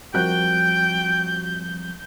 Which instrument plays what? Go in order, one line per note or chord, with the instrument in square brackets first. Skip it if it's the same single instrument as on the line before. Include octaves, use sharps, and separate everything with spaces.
[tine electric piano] F3 G3 C4 [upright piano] F#4 A#4 F#6 [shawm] G5 [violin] G6